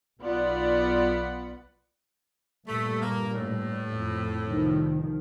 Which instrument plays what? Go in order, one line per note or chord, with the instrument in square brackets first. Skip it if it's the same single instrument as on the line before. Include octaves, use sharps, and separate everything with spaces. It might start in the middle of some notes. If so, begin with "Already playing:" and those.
[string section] B1 B3 F4 D5 F#5 B5
[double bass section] G2 A#2 [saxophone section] A3
[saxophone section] A#3
A2
[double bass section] F2
C2 D#3 F3